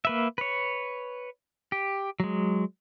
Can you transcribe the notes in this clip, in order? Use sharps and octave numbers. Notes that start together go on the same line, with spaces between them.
A#3 B4 E5
B4 C#5
G4
F#3 G#3